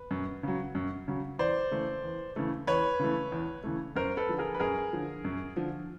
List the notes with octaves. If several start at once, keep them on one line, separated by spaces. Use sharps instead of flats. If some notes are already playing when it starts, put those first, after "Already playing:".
Already playing: B4
F#2
C#3 F#3
F#2
C#3 F#3
E2 C5 D5
C#3 E3 A3
E2
C#3 E3 A3
E2 B4 C#5
C#3 E3 A3
E2
C#3 E3 A3
F#2 A#4 C5
A4 B4
D3 F3
G#4 A#4
B4
F#2 G#4 A#4
D3 F3
F#2
D3 F3